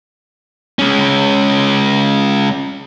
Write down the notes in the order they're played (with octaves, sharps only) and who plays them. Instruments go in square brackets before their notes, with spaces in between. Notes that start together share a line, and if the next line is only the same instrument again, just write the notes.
[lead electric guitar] G#3 C#4